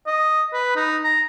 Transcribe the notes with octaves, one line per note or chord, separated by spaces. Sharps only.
D#5
B4
D#4
A#5